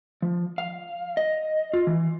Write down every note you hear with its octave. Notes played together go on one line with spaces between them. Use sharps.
F3
F5
D#5
F4
E3